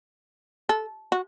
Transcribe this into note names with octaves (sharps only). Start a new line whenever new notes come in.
A4
F#4